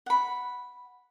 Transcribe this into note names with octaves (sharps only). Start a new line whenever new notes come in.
F#5 B5